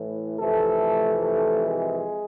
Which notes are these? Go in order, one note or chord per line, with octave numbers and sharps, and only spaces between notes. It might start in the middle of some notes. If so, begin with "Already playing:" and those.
Already playing: A2 E3
F2 C3 E3 A3 A4
A3 A4
G#3 G#4